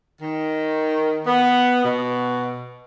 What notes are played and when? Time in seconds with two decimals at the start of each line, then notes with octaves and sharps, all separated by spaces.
0.21 D#3
1.26 B3
1.84 B2